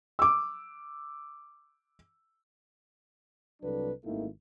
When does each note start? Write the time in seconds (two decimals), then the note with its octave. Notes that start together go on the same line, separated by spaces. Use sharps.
0.19 D6 E6
3.63 C2 F#3 D4 A4 B4
4.05 G#1 D#3 A3 A#3 E4